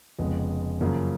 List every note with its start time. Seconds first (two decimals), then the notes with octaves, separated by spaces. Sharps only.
0.19 F1 F2 C#3 G#3 B3
0.81 F#2 C#3 F3 A#3